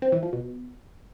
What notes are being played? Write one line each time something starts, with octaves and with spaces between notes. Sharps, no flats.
C4
E3
F3
B2